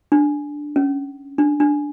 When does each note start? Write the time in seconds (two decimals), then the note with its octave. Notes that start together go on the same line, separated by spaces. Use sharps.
0.12 D4
0.76 C#4
1.38 D4
1.60 D4